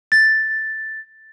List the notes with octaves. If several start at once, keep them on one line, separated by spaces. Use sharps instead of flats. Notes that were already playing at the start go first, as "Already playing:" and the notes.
A6